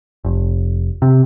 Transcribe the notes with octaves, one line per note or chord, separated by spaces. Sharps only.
F1
C3